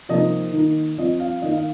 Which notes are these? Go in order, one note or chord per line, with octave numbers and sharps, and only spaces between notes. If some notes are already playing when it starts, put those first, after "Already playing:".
C3 F3 A#3 D#4 D#5
D#3 A#3 D#4
F2 F3 C4 D#5
F5
D#3 A#3 D#4 D#5
F5